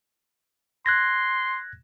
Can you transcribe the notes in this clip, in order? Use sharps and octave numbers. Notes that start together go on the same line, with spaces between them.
C6 F#6 G#6 A#6